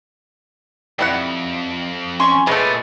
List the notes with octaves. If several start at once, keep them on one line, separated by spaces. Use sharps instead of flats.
F2 G#2 G3 E4 F#5
C#4 C6 C#6
A#2 G#3 A3 B3 C#5 D#5